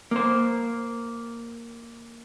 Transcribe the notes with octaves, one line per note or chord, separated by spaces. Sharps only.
A#3 C5